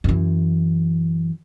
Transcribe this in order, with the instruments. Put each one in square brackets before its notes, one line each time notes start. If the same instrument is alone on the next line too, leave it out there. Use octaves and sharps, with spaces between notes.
[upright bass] F#2 E3